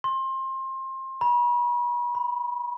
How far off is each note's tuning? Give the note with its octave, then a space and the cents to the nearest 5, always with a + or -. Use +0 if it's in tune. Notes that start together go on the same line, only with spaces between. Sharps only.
C6 +25
B5 -40
B5 +5